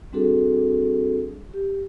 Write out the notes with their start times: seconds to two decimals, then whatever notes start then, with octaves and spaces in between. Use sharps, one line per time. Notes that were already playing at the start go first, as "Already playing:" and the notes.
0.13 G3 C4 D4 F#4 G#4 A4
1.54 G4